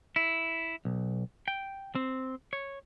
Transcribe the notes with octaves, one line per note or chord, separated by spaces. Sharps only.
E4
B1
G5
C4
C#5